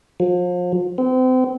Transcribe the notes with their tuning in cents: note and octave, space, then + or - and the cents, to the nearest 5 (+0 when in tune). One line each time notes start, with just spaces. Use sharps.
F3 +35
C4 -35